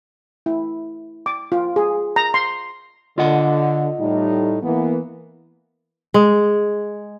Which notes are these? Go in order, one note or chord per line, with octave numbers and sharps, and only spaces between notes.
E4
D6
F4
G#4
A#5
C6
D3 F4 D#5 F#5
A2 G3 D#4
E3 A#3 B3
G#3